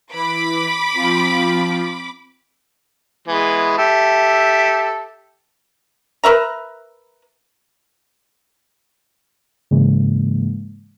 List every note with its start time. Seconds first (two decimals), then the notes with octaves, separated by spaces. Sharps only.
0.13 E3 B5 D6
0.95 F3 C4 F4
3.28 E3 G#3 B3
3.78 G4 A4 E5
6.24 A#4 B4 E5 A#5
9.71 G#2 C#3 E3 G#3 A#3